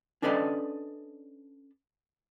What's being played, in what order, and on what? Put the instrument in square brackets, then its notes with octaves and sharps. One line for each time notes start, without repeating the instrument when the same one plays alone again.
[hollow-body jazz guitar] C#4 D4 A4 B4 D5 D#5